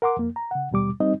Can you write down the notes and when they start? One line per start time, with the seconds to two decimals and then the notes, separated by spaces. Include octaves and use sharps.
0.02 A#4 F#5 C6 D6
0.17 F2 A#3
0.36 A#5
0.51 C#3 F#5
0.71 D#2 B2 G3 D6
1.00 G3 C4 D#4 D#5